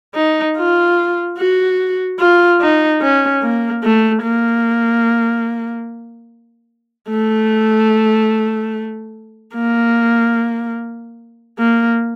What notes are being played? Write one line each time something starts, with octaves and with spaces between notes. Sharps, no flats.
D#4
F4
F#4
F4
D#4
C#4
A#3
A3
A#3
A3
A#3
A#3